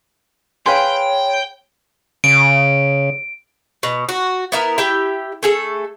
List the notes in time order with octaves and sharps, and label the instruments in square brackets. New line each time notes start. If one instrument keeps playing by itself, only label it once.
[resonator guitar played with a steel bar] G#4 B4 F5 [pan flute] C#5 [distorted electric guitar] G5 [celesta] C6
[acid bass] C#3 [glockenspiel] D7
[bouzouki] B2
F#4
B3 E4 A#4
E4 G4 G5
A3 G#4 A4